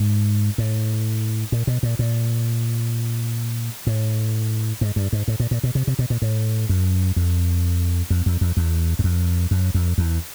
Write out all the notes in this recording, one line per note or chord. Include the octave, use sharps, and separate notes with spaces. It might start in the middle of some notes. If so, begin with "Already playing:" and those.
Already playing: G#2
A2
A#2
B2
A#2
A#2
A2
G#2
G2
G#2
A2
A#2
A#2
B2
C3
C3
B2
A#2
A2
F#2
F2
F2
F2
F2
E2
F#2
F2
F#2
F2
E2